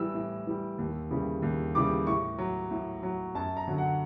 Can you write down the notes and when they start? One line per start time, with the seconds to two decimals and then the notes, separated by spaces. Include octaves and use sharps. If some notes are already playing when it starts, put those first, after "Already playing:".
Already playing: A2 E3 G3 E6
0.15 A2
0.47 E3 G3
0.79 D#2
1.11 C#3 E3 G3
1.42 D#2
1.75 C#3 E3 G3 D6
2.07 A2 C#6
2.38 F#3
2.71 A2
3.03 F#3
3.35 F#2 A5
3.57 A#5
3.68 D3 F#3
3.78 F#5